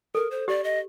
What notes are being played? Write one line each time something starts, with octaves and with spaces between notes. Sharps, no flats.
A4 A#4
C5
G4 D5
D#5